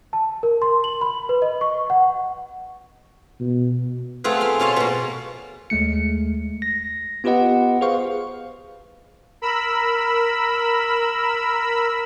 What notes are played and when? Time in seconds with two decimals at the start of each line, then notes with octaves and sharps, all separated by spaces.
0.13 A5
0.43 A#4
0.62 C6
0.84 F#7
1.01 B5
1.29 B4
1.42 D#5
1.61 C#6
1.90 F#5
3.40 B2
4.24 A3 B3 C4 F4 G#4 B4
4.41 F5 C6
4.59 B2 F4 C#5 A5 C6
4.76 B2 A#3
5.70 D#2 G#3 A3 C#7
6.62 A#6
7.24 B3 F4 G4 B4 D#5 F#5
7.81 G#4 B4 C5 F5 C#6
9.42 A#4 B5 E6